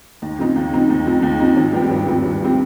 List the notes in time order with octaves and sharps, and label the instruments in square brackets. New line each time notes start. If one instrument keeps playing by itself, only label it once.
[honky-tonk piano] D#2
C#3 F3 C4 D#4
D#2
C#3 F3 C4 D#4
D#2
C#3 F3 C4 D#4
D#2
C#3 F3 C4 D#4
G#1
G2 F3 C4 G4
G#1
G2 F3 C4 G4
G#1
F3 C4 G4